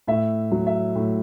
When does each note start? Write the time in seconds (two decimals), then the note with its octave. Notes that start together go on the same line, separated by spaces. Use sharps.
0.07 A2 E5
0.51 F#3
0.67 E5
0.95 A2